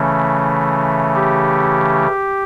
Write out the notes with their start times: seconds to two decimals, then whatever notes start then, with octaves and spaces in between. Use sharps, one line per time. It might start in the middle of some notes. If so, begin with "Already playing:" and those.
Already playing: C#3 E3 A3 C#4
1.15 G4